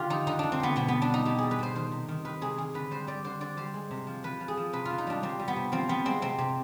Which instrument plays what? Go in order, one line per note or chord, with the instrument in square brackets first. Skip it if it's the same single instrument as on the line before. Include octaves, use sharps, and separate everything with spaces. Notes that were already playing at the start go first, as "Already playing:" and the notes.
Already playing: [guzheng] D3 F4 G4
F3 D#4
D3 D#4
D3 D4
C4
D3 B3
B2 B3
G3 B3
D4
G3 D#4
B2 G4
G3 G#4
B4
B2 C5
D#3 C5
C3
D#3
D#3 B4
C3 G#4
D#3 G#4
D3 B4
G3 C5
G3 D5
D3 C5
D3 D5
G3 C5
G#3
C3
F3
F3 B4
F3
G#4
F3
C3 B4
C3 F4
D#4
G3 D4
G3 C4
G3
B3
C3
F3 C4
F3 B3
G#3 C4
C3 C4
C3